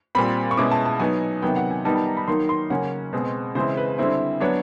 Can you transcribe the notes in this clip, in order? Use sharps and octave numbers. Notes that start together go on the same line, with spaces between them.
A#2 G3 C4 B5
C#6
B2 G#3 C#4 E4 D6
A5
A5
F#3 B3 D#4 G#5
C3 D#3 F#3 B3 G5
F#5
G#5
D#3 G3 B3 D#4 A5
A5
A#5
B5
D#3 F#3 A#3 D#4 C6
C6
C#3 F#3 A#3 C#4 F#5
B2 G#3 C4
C#3 E3 G#3 C4 E4 C5
B4
D3 G3 C4 E4 C5
F#3 B3 D4 C#5